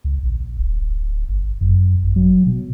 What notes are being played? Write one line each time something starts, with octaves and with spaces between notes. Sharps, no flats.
C#2
A#1
D1
G1
F#2
G#1
F#3
B2